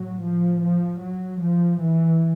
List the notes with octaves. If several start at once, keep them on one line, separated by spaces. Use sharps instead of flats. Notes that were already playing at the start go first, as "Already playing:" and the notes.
Already playing: A2 F#3
F3
F3
F#3
F3
E3